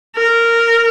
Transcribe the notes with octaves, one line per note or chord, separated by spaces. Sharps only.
A#4